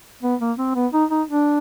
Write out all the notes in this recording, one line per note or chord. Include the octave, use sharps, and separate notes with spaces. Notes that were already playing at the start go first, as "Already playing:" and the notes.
B3
A#3
C4
B3
D#4
D#4
D4